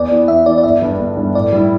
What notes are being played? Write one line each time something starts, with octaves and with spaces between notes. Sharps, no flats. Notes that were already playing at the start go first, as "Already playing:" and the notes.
Already playing: E2 D5
E3 B3
E2 E5
E3 B3 D5
D5
G1 E5
G2 G3 D4
G1
G2 G3 D4
A2 D5
G3 E4